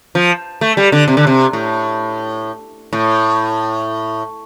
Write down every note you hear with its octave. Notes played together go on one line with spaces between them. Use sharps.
F3
A3
G3
D3
C3
D3
C3
A2
A2